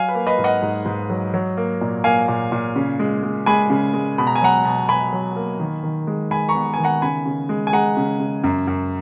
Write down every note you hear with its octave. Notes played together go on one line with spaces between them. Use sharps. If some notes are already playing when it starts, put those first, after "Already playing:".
Already playing: F#3 F5 G#5
B4
A#3
B4 D#5
G#2
D#5 F#5
G#2
G#2
F#3
F#3
A#3
A#2
A#3 F5 G#5
A#2
A#2
C#3
G#3
G#3
G#3 G#5 B5
C#3
G#3
B2 B5
A#5
G#5
F#3 F#5 A#5
B2
B2 G#5 B5
F#3
A#3
D#3
D#3
G#3
G#3 G#5 B5
A#5 C#6
B3
D#3 G#5
F#5 A#5
C#3 G#5 B5
C#3
G#3
G#5
G#3 F#5 A#5
C#3
C#3
F#2
F#2